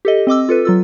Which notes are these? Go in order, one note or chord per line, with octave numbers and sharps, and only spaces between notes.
G4 A4 D#5
C4 D#5 D6 E6
F4 A4 B4
F#3 F4 E6